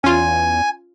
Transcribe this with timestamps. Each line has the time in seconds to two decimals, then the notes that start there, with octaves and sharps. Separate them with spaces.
0.04 E2 C#4 F4 G#5